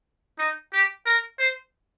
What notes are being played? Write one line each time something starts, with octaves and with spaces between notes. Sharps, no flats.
D#4
G4
A#4
C5